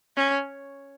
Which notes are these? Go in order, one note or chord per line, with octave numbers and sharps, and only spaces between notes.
C#4